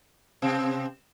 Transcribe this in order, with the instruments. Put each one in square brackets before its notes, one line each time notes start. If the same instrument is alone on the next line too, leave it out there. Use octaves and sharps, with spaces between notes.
[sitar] C3 C4